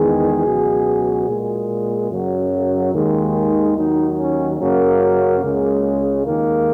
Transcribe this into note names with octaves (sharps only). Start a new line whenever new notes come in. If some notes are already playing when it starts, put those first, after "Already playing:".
Already playing: E2 D#3 G#3 G#4
C#2 B2 F#3
A#2 G#3
F#2 C#3 F#3
D#2 D#3 G#3
D#2 D#3 F#3 D#4
C#4
F#2 C#3 F#3 A#3
C#2 C#3 G#3
D#2 D#3 G#3 A#3